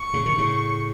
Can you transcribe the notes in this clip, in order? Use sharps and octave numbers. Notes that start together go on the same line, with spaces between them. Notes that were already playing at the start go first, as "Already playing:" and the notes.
Already playing: C#6
A2 C#3
C3 D#3
A2 C#3